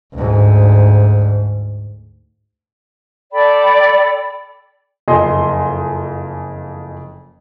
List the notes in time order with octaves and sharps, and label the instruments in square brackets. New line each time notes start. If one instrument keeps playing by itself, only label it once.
[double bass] D2 G#2
[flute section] A4 D5 G5 B5
[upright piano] F#1 F2 D#5 G#5 C6